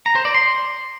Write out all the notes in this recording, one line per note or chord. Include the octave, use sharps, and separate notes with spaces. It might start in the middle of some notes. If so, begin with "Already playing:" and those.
A#5
C5
D5
C6